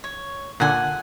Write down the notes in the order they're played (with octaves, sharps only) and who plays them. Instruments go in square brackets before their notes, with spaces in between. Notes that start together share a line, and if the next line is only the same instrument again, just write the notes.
[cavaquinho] C#5
[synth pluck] A#2 D3 [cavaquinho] F#5 G#5